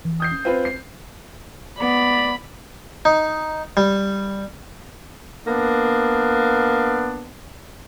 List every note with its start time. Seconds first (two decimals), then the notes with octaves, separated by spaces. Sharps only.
0.05 E3
0.20 D#6 G6 C7
0.31 C#4
0.45 C4 F4 B4
0.65 C7
1.80 B3 D5 B5
3.05 D#4
3.77 G3
5.47 A#3 B3 D4